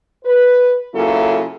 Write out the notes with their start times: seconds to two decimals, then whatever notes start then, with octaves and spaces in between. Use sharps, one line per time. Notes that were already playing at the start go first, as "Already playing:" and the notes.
0.25 B4
0.94 C#3 F#3 A#3 E4 F4 A4